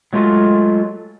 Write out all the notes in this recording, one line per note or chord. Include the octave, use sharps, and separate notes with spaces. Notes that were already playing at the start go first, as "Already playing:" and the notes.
F#3 G#3 A3 F4 F#4